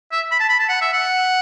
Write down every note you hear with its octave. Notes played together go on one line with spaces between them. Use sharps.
E5
B5
A5
B5
A5
F#5
E5
F#5